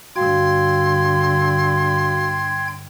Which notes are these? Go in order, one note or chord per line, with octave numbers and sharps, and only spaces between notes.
G2 D3 F#4 F5 G5 C6 G#6